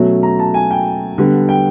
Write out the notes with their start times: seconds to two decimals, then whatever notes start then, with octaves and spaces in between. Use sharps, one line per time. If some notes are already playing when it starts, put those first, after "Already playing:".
Already playing: B2 F#3 A3 C#4
0.23 A#5
0.39 A5
0.54 G#5
0.71 G5
1.18 D3 G3 B3
1.49 G5